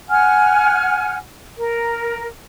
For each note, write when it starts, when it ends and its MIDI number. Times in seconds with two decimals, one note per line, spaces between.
0.10 1.16 78
0.10 1.16 80
0.10 1.16 89
1.58 2.26 70